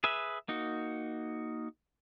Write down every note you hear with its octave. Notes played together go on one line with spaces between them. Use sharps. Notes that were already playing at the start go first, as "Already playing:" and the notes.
G#4 B4 E5
A#3 D#4 F#4